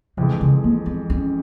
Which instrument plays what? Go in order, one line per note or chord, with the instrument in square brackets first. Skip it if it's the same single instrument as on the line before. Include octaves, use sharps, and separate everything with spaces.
[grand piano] F2 E3 G#3 [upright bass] C3
[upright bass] C#3
A#3
C4
C#4